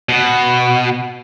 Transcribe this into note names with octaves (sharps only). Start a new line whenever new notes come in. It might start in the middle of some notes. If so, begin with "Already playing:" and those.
B2